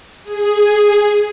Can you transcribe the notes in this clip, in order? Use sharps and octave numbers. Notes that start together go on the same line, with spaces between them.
G#4